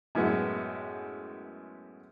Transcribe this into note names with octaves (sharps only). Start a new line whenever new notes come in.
F#2 A2 G#3 B3